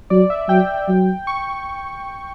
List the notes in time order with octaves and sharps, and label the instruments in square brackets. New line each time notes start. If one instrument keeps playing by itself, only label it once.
[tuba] F#3 [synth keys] D5
[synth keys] E5
[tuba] F#3 [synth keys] G5
[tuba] F#3
[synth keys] C#6